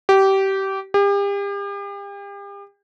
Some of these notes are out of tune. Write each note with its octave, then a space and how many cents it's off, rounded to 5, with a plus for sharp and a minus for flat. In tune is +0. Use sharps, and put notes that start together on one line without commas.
G4 -20
G4 +40